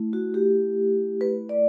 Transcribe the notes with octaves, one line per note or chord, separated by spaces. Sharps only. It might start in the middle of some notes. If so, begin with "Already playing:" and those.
Already playing: A3 E4
F#4
G4
B4
D5